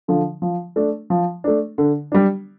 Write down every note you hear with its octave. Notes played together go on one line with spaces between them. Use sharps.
D3 F3
F3
A3 D4
F3
A3 D4
D3
G3 D4